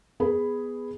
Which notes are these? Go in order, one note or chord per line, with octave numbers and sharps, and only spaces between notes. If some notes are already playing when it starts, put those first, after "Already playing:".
B3 G#4 B4 B5